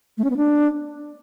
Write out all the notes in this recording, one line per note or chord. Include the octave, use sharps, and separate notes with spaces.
A3
C#4
B3
D4